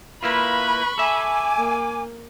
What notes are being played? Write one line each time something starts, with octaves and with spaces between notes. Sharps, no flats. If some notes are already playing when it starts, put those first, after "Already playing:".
A#3 E4 F4 B4 B5 C#6
A4 E5 G#5 D6
A#3